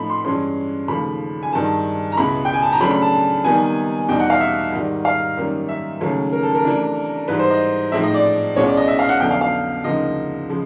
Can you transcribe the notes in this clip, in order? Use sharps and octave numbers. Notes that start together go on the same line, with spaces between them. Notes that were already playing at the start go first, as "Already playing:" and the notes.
Already playing: A2 F3 A3 C4 D#4 B5
C6
G2 E3 G#3 C#4 C6
D#2 C#3 F3 A3 B5
G#5
G2 D#3 G#3 C4 A5
A#5
C#2 B2 G#3 B3 E4 B5
G5
G#5
A5
A#5
C#3 F#3 A3 D4 B5
B5
A5
C3 D#3 G3 B3 G#5
E2 B2 G3 C4 D#4 G5
F#5
F5
E5
G#2 D#3 G3
F5
F#2 D#3 G3 A#3
E5
D#2 C#3 F#3 A3 C#4
A#4
A4
A#4
C3 E3 A3 D4
G#2 E3 G3 B4
C5
D#5
A2 F3 G#3 C4 D#4 E5
D#5
D5
C2 B2 G#3 C#4 C#5
D5
D#5
E5
F5
F#5
F2 D3 F#3 B3 G5
F5
F5
D2 C#3 F3 A#3 D#4 D#5
C#3 F3 G#3